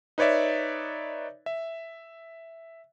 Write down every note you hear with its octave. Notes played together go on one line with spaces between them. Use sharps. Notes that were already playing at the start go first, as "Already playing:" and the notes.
D#4 B4 C#5 D5 E5
E5